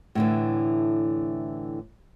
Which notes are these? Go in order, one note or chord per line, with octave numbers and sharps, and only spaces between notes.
A2 D3 E3